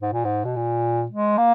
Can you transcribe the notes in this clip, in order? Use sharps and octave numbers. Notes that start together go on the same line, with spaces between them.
G#2
A#2
G#2
B2
A#2
G#3
A#3